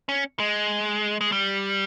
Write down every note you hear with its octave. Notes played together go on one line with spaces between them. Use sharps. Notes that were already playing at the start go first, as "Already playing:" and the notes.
C#4
G#3
G#3
G3